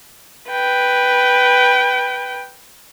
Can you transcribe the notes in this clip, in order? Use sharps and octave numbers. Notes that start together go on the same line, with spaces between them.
B4 G5